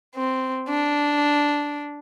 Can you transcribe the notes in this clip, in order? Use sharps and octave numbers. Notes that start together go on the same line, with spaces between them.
C4
D4